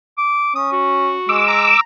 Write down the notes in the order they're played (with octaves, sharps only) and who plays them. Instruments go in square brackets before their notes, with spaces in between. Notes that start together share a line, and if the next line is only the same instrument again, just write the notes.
[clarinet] D6
[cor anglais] C#4 [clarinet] D#6
[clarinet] F#4
[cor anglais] G#3 [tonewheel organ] D6 E6
[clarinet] A#5